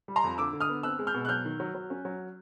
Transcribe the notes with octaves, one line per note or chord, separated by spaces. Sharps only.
G3
A#5 C6
F2
D3 D6 E6
D3
D#6 F6
B3
C4 E6 F#6
G#3
F6 G6
B2
F#6
F#3 F6 G6
D#3
F#3
F#3
C#4
F#3